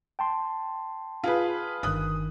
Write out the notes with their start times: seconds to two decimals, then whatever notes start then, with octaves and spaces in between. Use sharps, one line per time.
0.19 G5 A5 C6
1.24 F4 G#4 B4
1.83 G1 G2 D#3 D#6 F#6